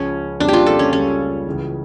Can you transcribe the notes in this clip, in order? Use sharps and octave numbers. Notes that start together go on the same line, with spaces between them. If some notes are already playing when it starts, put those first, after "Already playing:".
Already playing: C#2 C#3 F3 C#4
F2 C#3 G3 A#3 D4
F4 G4
A4
C#4
C#2 C#3 G3 C#4
C#2 C#3 E3